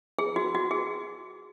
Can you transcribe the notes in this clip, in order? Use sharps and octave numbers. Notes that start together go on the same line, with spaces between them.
G#4
F#4
F#4
G#4